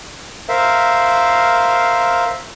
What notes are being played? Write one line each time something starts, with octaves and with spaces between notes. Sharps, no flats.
A#4 C5 E5 F5